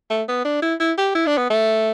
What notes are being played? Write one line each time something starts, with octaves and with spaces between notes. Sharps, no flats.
A3
B3
D4
E4
E4
G4
E4
D4
B3
A3